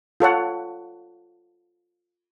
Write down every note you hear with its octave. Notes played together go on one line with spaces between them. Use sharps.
F4 A4 C#5 F#5